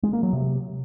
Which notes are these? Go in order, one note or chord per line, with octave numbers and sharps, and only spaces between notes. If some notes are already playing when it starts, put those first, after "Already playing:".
G#3
A#3
F#3
C3